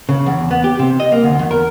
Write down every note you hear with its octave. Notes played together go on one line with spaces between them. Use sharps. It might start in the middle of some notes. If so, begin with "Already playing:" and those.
C#3
E2
B3
G4
C3
D#5
A#3
D2
E2
A#4